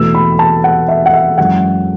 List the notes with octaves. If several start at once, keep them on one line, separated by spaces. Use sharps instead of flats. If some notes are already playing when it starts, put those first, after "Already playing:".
Already playing: E2 B2 A3 E6
B5
A5
F#5
E5
F#5
E5
F#2 E3 G#3 F#5